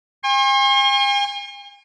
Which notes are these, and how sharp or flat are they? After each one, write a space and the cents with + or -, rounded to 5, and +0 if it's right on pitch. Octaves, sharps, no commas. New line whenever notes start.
G#5 -45 C6 +45